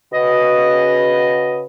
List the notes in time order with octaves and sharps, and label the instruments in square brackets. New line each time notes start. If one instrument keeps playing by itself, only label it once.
[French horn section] C#3 F#4 B4 [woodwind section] D#5